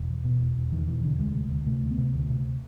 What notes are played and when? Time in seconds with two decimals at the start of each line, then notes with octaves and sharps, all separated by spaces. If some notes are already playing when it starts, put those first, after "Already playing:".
Already playing: E1
0.10 E2
0.24 B2
0.40 E1
0.57 E1
0.72 E2 D#3
0.87 B2 E3
1.03 E1 D3
1.19 D2 G#3
1.35 C3
1.51 D2
1.66 C3 A3
1.82 D2
1.91 B3
1.98 C3
2.14 D2
2.30 C3